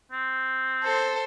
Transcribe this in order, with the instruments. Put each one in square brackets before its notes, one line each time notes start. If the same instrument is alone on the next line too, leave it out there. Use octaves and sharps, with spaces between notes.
[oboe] C4
[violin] A4 C5